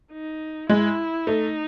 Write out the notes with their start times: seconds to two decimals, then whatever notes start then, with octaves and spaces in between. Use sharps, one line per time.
0.12 D#4
0.69 G#3 E4
1.27 A3 D#4